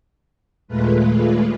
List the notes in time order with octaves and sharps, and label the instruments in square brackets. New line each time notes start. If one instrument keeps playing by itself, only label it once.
[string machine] D#2 A#2 G#3 A3 F4 B4